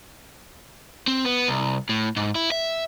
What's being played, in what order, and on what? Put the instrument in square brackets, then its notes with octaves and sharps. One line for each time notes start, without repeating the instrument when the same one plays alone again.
[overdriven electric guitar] C4
B3
C2
A2
G#2
E4
E5